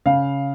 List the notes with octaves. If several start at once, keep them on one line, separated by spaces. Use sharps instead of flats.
C#3 F5